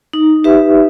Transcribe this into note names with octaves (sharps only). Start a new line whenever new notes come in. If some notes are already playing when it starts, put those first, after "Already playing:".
D#4
G4 B4 E5